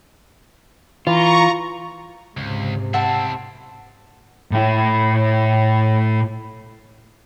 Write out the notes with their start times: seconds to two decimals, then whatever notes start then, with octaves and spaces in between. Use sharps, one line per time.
1.07 E3 F4 A#5 C#6
2.37 C#2 G#2 C3
2.94 C4 E4 E5 F#5 A5
4.52 A2 E4